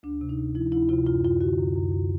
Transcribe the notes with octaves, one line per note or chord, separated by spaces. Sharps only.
D2 D4
C3
D#4
D2
F3 E4
D2 E4
C3 F4
F#2 F4
F#2 F4
D3 F#4
F#2
F#2
F#2